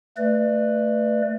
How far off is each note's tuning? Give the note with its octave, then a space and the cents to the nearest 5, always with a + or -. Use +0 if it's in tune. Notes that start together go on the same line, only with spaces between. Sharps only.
A3 +20 B4 +0 D5 +30